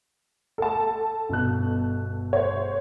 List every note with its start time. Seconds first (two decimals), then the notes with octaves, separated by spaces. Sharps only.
0.58 A4 A5
1.29 G1 B2 F#6
2.33 C5 C#5